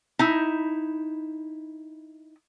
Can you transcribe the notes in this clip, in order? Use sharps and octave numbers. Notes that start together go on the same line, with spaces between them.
D#4 E4